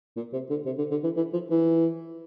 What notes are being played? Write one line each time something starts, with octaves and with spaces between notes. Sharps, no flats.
A#2
C3
D3
C3
D3
D3
E3
E3
F3
E3